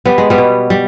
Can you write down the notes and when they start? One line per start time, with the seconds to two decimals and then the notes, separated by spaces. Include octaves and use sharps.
0.06 G3 B3
0.18 G#3
0.30 G3 B3
0.38 B2
0.70 G3